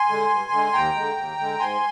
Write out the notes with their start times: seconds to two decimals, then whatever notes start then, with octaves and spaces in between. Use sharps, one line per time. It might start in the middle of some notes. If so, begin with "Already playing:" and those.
Already playing: G#5 C6
0.08 D3 G#3
0.29 G2
0.51 D3 G#3
0.73 D#2 G5 A#5
0.95 D3 G#3
1.16 D#2
1.38 D3 G#3
1.59 G#2 G#5 C6